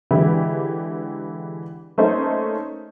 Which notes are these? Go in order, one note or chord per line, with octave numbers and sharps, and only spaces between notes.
D3 E3 G#3 E4 G4 B4
A3 A#3 C#4 D#4 C5